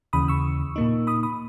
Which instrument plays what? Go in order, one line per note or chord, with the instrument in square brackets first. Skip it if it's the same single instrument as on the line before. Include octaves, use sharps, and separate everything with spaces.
[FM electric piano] D#2 C#3 E3 B5 D#6
C#6 E6
A#2 A#3 D#4
B5 D#6
B5 D#6